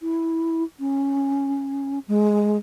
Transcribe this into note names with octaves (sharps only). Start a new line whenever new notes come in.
E4
C#4
G#3